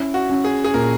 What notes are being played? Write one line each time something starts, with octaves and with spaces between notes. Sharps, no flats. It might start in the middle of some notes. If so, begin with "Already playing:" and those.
Already playing: C#4 E4
F#4
C#4
G#4
G#4
A#2 A#4